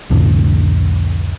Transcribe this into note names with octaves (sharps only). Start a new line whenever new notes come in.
C2 F2 A2 D3